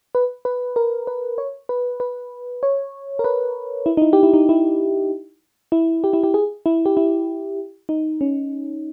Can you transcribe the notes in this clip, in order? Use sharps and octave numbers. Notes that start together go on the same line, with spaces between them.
B4
B4
A#4
B4
C#5
B4
B4
C#5
A#4
B4
E4
D#4
E4
G4
E4
D#4
E4
E4
G4
E4
G4
G#4
E4
G4
E4
D#4
C#4